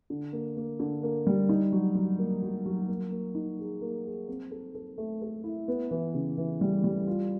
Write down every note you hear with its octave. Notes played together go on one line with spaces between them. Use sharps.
D3
A#3
A#3
D3
A#3
G3
D#4
F#3
F#3
A#3
F#3
F#3
A#3
A#3
D#4
G#4
A#3
G#4
C4
A4
A4
A3
A4
E4
B3
E3
C#3
E3
G3
G3
F4